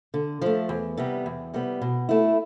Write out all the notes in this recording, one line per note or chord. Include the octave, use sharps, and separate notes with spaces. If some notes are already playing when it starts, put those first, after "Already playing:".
D3
F3 A3
E2
C3 G3 B3
E2
C3 G3 B3
B2
A3 E4